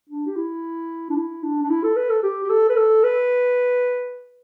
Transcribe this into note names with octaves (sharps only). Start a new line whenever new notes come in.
D4
G4
E4
D4
E4
D4
D4
E4
A4
B4
A4
G4
G4
A4
B4
A4
B4